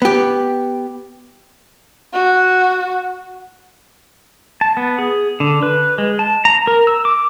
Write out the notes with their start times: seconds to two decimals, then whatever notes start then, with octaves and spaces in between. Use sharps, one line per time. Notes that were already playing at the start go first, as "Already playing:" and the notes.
0.02 B3 G4
2.14 F#4
4.61 A5
4.77 B3
4.99 G#4
5.40 D3
5.63 B4
5.98 G#3
6.19 A5
6.45 A#5
6.67 A#4
6.87 E6
7.05 D6